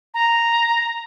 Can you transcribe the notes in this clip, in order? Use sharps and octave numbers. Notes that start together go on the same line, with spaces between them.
A#5